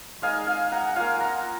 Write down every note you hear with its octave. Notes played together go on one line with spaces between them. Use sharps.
G#3 D#4 F5 G#5
F5 G#5
F#5 A#5
A#3 F4 F5 G#5
F#5 A#5